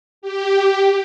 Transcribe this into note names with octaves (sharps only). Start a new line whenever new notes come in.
G4